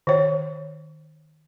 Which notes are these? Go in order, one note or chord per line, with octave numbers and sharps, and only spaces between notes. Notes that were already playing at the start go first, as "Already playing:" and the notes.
D#3 C#5